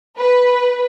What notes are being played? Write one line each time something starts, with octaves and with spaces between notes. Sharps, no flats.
B4